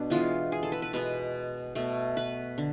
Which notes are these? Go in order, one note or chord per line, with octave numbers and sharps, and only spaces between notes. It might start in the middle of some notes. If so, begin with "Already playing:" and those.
Already playing: B2 D4
E3 G#3 B3 F4
G#4
A4
B4
B4
B2 G#3 B3 B4
B2 A3
B4
D3